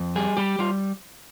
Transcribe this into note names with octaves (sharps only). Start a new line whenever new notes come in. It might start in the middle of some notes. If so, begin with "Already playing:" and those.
Already playing: F2
G3 G#4
G3 G4
G3 F4